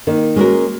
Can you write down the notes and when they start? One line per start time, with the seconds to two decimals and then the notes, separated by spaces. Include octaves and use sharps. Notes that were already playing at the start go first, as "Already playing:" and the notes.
0.07 D#3 A#3
0.36 G#3 C#4 F#4 A#4